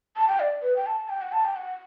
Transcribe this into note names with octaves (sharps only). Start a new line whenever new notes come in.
A5
G5
D5
B4
G5
A5
G5
F#5
A5
G5
F#5